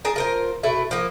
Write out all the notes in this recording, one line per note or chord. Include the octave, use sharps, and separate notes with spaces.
G#4 A#4 A5
F4 A#4 C5
B2 A3 E4
F3 A#3